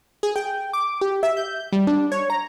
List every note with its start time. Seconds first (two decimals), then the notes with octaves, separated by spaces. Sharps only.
0.23 G#4
0.36 G5
0.73 D6
1.01 G4
1.23 E5
1.37 G6
1.72 G3
1.87 D4
2.12 C#5
2.30 A#5